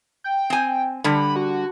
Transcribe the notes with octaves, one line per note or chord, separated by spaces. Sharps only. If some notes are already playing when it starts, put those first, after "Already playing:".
G5
C4 G#5
D3 G3 B5
F#4